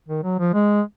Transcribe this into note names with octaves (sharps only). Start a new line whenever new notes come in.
D#3
F#3
F3
G#3